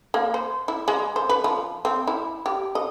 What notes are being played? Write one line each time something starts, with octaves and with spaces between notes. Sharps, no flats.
A#3
C5
E4
G#3
C5
B4
F3
C4
E4
G4
D#5